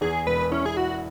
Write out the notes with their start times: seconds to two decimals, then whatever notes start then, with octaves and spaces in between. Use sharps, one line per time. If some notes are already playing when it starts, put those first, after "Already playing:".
0.01 E2 G#4
0.26 E1 B4
0.52 C#4 E4
0.66 G#4
0.77 E4 F#4